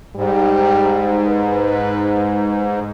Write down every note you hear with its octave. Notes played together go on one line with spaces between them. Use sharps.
G#2 G3
B4